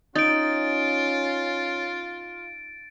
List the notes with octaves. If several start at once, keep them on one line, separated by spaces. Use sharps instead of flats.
C#4 D#4 F4 A6 D7